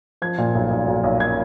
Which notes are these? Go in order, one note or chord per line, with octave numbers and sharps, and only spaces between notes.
F3 G#6
A#2
B1
B1
B1
B1
G#6